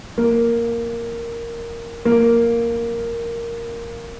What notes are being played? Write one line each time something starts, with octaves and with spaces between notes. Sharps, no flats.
A#3
A#3